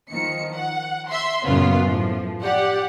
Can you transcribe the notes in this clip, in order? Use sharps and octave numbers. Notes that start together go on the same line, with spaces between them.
D#3 F3 C#7
F#5
E5 C6
F#2 A#2 C#3 B3 F4
A2 F3
G4 D5 F#5